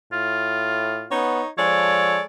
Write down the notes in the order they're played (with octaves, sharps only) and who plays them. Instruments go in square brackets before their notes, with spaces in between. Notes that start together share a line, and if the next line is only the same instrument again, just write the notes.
[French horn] A2 [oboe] F4
[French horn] B3 [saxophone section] D#4 C#5
[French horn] F3 [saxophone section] G#3 A4 D5 [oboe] C#5